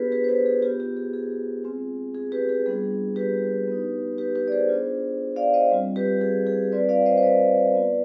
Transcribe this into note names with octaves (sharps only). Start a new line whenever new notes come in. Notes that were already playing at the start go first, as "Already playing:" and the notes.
Already playing: B3 D4 F4 G4 G#4 B4
G4 B4
C5
G4 B4
G#4
B3 F4 G4
G4
G#4
G#4
G#3 C4 F4
G#4
G4 B4
G#4
G3 B3 D4 F4 G#4
G4 B4
B3 D#4
G4 B4
G4 B4
D5
G#4 C5
B3 D4 F4
D5 F5
C5 D#5
G3 C4 F4
G4 B4
G#4
G#4
G3 C4 F4 B4 D5
D5 F5
C5 D#5
C5
B4 D5
B3 F4